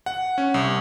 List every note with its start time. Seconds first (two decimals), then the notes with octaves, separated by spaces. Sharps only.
0.06 F#5
0.38 C#4
0.54 C2